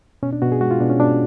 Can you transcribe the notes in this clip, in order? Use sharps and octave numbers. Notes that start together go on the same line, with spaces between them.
B2 C#4
D4
B2 F#4
G#4
G#3 F#4
F4
B2 D4
C#4
B2 D4